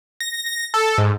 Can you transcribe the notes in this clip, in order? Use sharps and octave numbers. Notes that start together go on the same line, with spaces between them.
A#6
A#6
A4
G#2